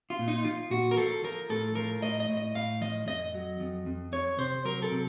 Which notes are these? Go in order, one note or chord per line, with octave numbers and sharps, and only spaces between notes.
F4
A#2
D#4
F3 F4
A#2 F#4
A#4
F3 A4
F3 A#4
A2 A4
F3 A#4
A2 D#5
D#5
A2
D#5
A2 F5
F3 D#5
F2 D#5
F#3
F2
F2
F2 C#5
C3 C5
F#3 A#4
A4
C3